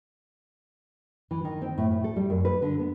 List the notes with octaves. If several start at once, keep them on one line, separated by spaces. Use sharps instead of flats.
E3
D#3
C4
A2
A2
A4
G3
F#2
B4
D3
B3